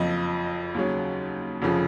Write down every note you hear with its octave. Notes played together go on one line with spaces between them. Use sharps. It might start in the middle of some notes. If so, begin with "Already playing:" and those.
Already playing: F#1 F2 F3 D#5
D#2 C#3 F#3
F1 F2 C#3 F3